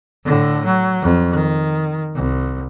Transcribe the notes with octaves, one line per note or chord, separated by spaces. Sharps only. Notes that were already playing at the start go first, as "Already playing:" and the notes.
A2 D3
F#3
F2
D#3
C2